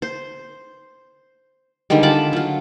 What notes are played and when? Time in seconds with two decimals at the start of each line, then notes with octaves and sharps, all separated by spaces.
0.02 C5
1.90 D3 D#3 G3 G#3
2.03 F4 A5 B5 D6
2.33 F#3 F4